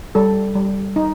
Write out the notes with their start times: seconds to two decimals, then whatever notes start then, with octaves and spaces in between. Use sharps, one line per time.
0.15 G3 A4
0.55 G3
0.96 D#4